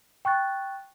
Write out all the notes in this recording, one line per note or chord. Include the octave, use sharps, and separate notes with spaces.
G5 C#6 F#6 A6